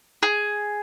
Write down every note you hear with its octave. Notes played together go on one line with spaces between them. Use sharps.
G#4